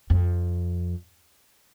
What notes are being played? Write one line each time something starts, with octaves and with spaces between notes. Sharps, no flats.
F2